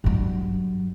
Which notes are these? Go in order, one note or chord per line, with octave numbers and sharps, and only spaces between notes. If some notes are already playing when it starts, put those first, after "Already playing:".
G2 F#3